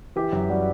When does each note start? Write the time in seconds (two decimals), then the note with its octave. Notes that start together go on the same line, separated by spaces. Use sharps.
0.16 E3 G4
0.32 F#2
0.49 G3 F#4